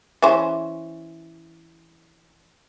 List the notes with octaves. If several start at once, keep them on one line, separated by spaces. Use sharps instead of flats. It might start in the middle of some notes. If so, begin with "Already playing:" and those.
E3 C#4 C5